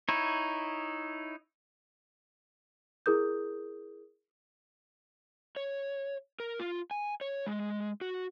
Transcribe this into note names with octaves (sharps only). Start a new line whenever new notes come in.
D#4 E4 C#5
E4 G#4 A#4 D#6 G6
C#5
A#4
F4
G#5
C#5
G#3
F#4